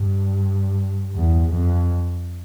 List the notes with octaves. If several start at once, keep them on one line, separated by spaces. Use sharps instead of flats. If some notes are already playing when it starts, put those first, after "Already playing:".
Already playing: G2
E2
F2